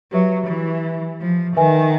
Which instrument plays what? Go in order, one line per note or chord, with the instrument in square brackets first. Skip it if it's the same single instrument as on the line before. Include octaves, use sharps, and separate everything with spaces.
[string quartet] F#3 [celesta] G4 B4 E5
[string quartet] E3
F3
[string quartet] D#3 [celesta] B4 E5 G#5